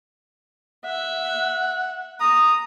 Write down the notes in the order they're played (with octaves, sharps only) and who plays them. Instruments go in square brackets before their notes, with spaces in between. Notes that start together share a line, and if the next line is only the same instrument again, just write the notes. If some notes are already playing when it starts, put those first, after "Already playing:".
[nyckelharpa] E5 [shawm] F#5
[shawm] A#5 [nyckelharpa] D#6